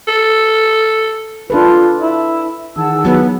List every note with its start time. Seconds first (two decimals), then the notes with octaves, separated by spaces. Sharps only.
0.08 A4
1.50 D4 F4 A4 B4
2.00 E4
2.76 D#3 E3 G#4 F#5 A5 E6
3.05 F#3 B3